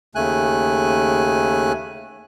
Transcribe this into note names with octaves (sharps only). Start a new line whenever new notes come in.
D#2 C#3 A3 G#5 F#6